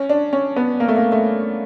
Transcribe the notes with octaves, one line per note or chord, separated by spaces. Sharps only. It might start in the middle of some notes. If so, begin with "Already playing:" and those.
Already playing: C#4
D4
C#4
B3
A#3
A3
A#3
A3